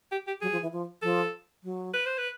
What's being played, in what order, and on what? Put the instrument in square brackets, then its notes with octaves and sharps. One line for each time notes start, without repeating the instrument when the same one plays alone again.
[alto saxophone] G4
G4
[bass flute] F#3 [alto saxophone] G#4
[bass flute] F3
E3
F3
[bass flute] F3 [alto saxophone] A4
[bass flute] F#3
[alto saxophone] B4
C5
B4